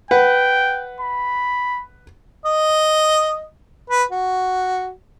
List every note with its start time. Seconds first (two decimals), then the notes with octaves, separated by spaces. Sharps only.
0.11 B4 F#5 G5
1.01 B5
2.45 D#5
3.90 B4
4.11 F#4